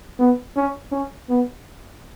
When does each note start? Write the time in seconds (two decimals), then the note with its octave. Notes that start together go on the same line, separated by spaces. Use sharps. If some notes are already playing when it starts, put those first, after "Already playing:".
0.19 B3
0.56 C#4
0.92 C#4
1.29 B3